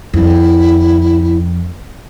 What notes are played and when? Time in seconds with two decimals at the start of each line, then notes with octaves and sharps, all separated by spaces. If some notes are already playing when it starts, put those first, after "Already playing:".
0.13 F2 E4